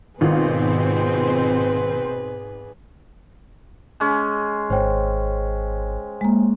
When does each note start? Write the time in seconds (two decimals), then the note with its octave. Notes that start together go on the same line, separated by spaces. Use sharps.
0.21 G#1 G#2 B2 D#3 C4 F4 G#4 B4
4.00 G#3 C#4
4.70 G#1 C5 C#5 G5
6.21 G#3 A#3